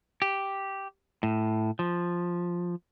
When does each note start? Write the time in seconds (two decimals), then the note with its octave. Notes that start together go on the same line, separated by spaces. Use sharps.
0.22 G4
1.23 A2
1.79 F3